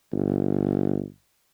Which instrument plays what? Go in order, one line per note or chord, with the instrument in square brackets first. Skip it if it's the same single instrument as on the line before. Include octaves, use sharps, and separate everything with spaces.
[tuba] G1